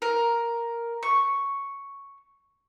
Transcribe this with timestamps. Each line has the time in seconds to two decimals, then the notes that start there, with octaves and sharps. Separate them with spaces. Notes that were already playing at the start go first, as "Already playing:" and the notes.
0.02 A#4
1.03 C#6